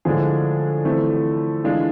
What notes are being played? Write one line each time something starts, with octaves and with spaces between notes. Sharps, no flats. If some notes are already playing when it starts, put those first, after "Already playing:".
A2 D3 F3 G#3 D4 G#4
E3 A3 C4
E3 G#3 D4 F4 G#4